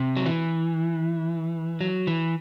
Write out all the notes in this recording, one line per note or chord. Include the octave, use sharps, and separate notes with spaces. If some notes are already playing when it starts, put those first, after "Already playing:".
Already playing: C3
F#3
E3
F#3
E3